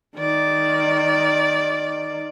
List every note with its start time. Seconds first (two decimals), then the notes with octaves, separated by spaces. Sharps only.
0.17 D#3 D5